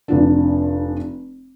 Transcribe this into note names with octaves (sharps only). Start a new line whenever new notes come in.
F1 F3 D4